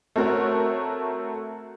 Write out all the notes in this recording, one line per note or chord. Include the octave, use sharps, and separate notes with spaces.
A3 C4 F#4 A#4 C#5